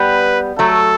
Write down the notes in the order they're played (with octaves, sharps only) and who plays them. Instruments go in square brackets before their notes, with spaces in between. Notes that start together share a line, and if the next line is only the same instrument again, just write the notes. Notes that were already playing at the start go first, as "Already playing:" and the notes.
Already playing: [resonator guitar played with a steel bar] G3 B3 [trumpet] B4
[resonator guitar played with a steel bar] F#3 A3 [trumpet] A4